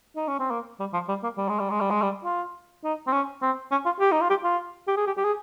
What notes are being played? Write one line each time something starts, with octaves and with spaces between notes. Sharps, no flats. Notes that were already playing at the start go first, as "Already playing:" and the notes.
D#4
C#4
C4
A#3
G3
F3
G3
A#3
G3
G#3
G3
G#3
G3
G#3
G3
F4
D#4
C4
C#4
C4
C#4
F4
G4
D#4
F4
G4
F4
G4
G#4
G4
G4
G#4